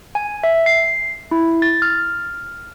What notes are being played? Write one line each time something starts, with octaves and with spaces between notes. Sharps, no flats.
G#5
E5
C7
E4
A6
F6